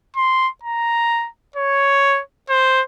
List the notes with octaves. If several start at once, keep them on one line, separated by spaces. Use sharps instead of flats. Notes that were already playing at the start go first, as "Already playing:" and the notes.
C6
A#5
C#5
C5